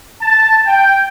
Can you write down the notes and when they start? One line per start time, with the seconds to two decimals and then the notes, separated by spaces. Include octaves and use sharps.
0.22 A5
0.66 G5